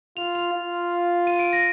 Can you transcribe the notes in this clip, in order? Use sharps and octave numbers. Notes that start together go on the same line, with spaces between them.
F4 F7
F7
F4
D#7
D7
A#6